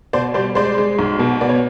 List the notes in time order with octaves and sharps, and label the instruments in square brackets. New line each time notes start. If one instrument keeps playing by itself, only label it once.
[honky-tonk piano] B2 C5 D5
G3 C5 D5
G#3 C5 D5
G#3
B1
B2
B3 D5
C#5